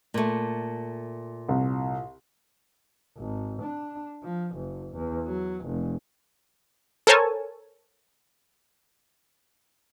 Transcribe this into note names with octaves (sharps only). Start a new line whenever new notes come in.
A#2 A3
C2
G#1
D4
F3
F#1
E2
F#3
F1
A4 A#4 C5 C#5 G#5 A5